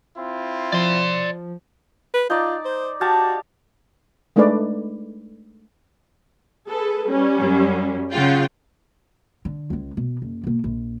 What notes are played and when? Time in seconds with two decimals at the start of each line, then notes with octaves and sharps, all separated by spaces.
0.17 C4 E4 F4
0.72 F3 D5 C6
2.14 B4
2.30 D#4 F4 D5
2.65 C5
3.01 F#4 G4 F5 A5
4.36 G#3 A3 D4 D#4 B4 D5
6.68 G#4 A4 B4
7.08 G3 C#4
7.38 F#2
8.12 C#3 F4 G#4 F#5 G5
9.45 D3
9.70 C#2 G#3
9.97 B2
10.22 F#1
10.44 B2 A#3
10.64 A#1